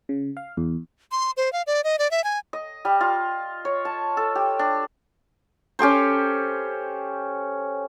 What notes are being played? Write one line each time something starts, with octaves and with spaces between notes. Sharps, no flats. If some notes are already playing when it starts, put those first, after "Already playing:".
C#3
F5
E2
C6
C5
F5
D5
D#5
D5
E5
G#5
D#5
G3
F4
C#5
A5
A4
G4
D4
C#4 G4 A4 C5